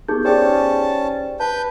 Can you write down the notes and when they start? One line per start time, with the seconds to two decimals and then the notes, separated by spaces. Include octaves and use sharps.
0.08 B3 D#4 G4 G#4 G6
0.25 C#4 G4 G#4 C5 D5 G5 A5
1.40 B4 A5 G6